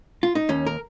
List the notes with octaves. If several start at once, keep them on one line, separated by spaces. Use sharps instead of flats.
F4
D#4
D#2 C#4
A#4